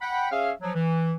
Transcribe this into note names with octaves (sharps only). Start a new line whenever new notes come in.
F#5 G5 B5
C#4 G#4 C#5 E5 F5
F3 F#3
E3